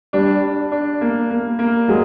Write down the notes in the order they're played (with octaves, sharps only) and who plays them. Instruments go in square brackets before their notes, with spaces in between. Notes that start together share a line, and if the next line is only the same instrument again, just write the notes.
[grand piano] G3 [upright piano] D4
[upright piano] D4
D4
A#3
A#3
A#3
[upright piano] F#3 [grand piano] G#3